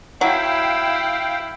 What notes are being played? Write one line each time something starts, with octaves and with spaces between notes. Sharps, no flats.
F#3 E4 F5 G5